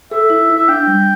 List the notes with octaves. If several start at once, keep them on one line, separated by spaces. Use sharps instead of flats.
A4 E5
E4
E4
E5
D4 G5
G3